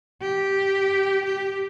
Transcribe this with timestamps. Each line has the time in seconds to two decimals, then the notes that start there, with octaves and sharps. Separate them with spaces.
0.22 G4
1.26 G4